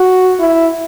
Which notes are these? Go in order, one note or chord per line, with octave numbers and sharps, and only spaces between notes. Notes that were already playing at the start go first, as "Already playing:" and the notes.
Already playing: F#4
E4